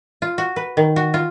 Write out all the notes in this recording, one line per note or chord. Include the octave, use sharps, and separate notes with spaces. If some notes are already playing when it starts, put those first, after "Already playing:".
F4
F#4
B4
D#3
F#4
F4